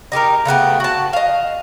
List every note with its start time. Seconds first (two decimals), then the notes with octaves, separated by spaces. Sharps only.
0.12 D#4 G4 A4 A#4
0.45 C#3 A3 B3 G4
0.80 F#4 A5
1.13 D#5 F5